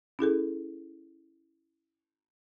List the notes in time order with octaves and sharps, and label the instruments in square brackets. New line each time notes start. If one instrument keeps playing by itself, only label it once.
[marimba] C#4 E4 G#4 A4